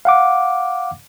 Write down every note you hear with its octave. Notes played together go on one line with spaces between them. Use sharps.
F5 F#5 D6